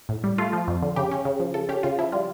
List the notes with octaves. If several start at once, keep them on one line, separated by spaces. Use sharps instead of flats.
A2
G3
A3 F4
F3
F2
D3
C#3 G4
C#4
C#3
F3
C#3 A4
C#4 G4
C#3 F4
F3 E4
G3 F4